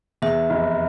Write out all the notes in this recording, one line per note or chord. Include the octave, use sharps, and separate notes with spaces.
E2 E5
F1